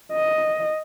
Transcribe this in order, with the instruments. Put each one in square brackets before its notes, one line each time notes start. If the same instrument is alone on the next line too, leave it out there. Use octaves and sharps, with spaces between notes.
[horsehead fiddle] D#5